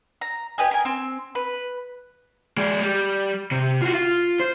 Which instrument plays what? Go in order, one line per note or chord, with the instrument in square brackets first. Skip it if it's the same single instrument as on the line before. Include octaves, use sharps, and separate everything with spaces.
[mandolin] A#5
G4 B4 D#5 G#5
A#4 G#5
C4
B4
[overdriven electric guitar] G#3 D5
G3
C3
F4 F#4
F4
C5